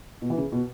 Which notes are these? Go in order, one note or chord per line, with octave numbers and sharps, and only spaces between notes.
B2
E3
C#3
B2